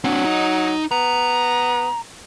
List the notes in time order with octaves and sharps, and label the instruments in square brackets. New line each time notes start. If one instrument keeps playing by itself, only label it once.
[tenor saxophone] F#3 [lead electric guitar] C4 D4
[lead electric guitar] D#4 D#5
[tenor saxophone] B3 [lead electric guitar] A#5